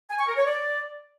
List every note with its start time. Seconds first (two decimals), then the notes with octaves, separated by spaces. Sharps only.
0.10 G#5
0.19 C#6
0.28 A#4
0.36 C#5
0.45 D5